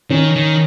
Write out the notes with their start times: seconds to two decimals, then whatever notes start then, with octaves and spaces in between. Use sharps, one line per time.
0.10 D#3 C#4
0.35 D#3